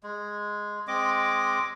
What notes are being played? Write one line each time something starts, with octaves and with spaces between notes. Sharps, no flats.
G#3
G#3 C4 D#5 D6